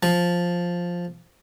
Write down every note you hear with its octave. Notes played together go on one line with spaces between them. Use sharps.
F3